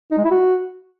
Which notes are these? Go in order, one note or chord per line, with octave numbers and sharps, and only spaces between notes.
D#4
G#3
E4
F#4